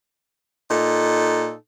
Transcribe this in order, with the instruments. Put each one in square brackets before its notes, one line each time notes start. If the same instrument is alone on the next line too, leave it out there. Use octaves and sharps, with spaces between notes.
[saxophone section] A#2 D#4 A4